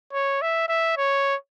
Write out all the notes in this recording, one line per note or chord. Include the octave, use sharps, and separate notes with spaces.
C#5
E5
E5
C#5